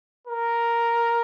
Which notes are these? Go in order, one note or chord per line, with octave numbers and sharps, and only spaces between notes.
A#4